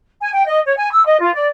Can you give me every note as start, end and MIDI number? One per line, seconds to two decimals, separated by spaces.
0.20 0.29 80
0.32 0.46 79
0.47 0.60 75
0.64 0.75 73
0.77 0.90 80
0.91 1.05 88
1.07 1.16 75
1.20 1.33 65
1.34 1.48 74